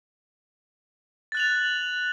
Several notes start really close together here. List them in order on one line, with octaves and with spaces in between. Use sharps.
A6 F#6 F#7 F7